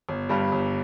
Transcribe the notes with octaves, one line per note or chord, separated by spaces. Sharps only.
G1
G2 G3
G1